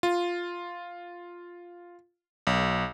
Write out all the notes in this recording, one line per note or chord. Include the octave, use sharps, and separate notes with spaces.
F4
B1